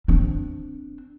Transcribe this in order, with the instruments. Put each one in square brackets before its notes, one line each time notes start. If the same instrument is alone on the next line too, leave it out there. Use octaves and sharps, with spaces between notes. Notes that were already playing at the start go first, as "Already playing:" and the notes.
[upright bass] C4 D4